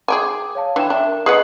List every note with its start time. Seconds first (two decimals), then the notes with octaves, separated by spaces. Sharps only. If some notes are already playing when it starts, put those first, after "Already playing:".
0.08 G#4 G5 G#5 D6
0.55 C#5 F5 A5
0.76 E3 D4 G5 E7
0.90 D4 E5
1.07 A#4
1.26 G#4 B4 D#5 F#5 F#7